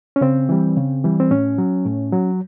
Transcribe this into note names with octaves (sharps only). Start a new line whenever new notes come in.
C#4
C#3 C4
E3 G3
C#3
E3 G3
C4
A2 C#4
F#3
A2
F#3